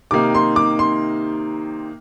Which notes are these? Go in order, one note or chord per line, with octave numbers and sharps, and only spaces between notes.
C3 D#3 A#3 D#4 D6
C6
D6
C6